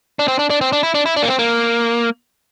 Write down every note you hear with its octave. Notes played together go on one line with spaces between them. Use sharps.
D4
C4
D4
D4
C4
D4
E4
D4
E4
D4
A#3
C4
A#3